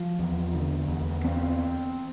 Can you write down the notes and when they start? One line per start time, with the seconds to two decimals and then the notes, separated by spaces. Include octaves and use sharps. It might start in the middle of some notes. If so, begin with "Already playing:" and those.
Already playing: F3
0.19 E2
0.54 D3
0.88 E2
1.25 C4